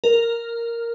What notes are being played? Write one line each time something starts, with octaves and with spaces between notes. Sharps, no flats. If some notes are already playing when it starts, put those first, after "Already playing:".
A#4